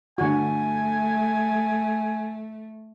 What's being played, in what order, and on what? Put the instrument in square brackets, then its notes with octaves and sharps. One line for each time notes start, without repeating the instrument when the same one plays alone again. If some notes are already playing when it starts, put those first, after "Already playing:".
[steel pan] D3 F#4 [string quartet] A3 [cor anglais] G#5